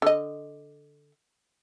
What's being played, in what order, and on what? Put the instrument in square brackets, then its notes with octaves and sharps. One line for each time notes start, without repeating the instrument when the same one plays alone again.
[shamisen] D3 D#5